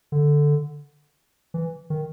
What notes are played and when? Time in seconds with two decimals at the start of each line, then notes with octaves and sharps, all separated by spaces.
0.12 D3
1.54 E3
1.90 D#3